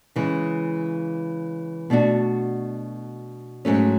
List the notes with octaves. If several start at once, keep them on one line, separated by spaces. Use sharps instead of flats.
C#3 E3 G#3
B2 A3 D4 F#4
G#2 F#3 A3 C#4